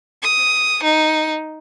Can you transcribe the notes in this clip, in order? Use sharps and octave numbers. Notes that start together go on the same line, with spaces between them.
D#6
D#4